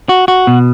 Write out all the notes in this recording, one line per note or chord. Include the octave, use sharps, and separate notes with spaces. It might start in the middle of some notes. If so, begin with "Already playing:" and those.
F#4
F#4
B2